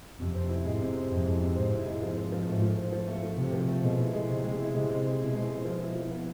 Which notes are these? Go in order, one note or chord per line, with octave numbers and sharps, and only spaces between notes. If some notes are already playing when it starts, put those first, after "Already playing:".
F2 C3
C4
E4
G#2 G#3
C3
C4
F2 E4
G#3
C3
G#2 C4
E4
G#3
F3
C4
F3
G#2 A3
F3
C4
F3
A3
F3
C3 C4
F3
A3
B2 G#3
E4
G#3
C3 C4
G#3
E4
C3 G#3
C4
G#3
B2 E4
G#3
C4
F3
E4
F3
B3